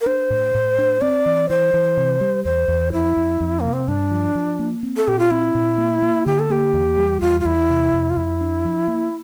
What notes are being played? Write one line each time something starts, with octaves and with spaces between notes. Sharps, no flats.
A#4
D4 C5
A2
A2
D4
C4 D5
E3
E3 C5
E3
C3
G3
E2 C5
E2
F2 E4
F2
F2
C3 A#3
C4
G2 D4
F3
F3
A#3
C4
A4
A#2 G4
F4
C4 E4
A#2
A#3
A#3
D3 G4
A4
A#3 G4
E2
G3
E2 F4
F4
E2 E4
C3
F2
F4
F2 E4
D4
F3
A#3